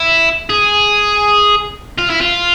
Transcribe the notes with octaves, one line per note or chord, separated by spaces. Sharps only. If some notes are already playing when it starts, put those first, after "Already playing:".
Already playing: E4
G#4
F4
E4
F4